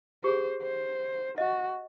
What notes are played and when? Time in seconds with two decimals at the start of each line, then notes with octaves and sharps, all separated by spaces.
0.24 G4 G#4 C5
0.62 C5
1.38 F#4 D#5